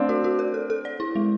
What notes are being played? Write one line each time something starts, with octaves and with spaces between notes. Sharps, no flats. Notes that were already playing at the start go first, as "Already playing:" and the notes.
Already playing: A3 C4 D4
F#4
F#4
A#4
A4
A4
D5
E4
G#3